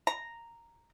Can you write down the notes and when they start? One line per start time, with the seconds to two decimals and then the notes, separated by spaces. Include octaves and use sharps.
0.07 A#5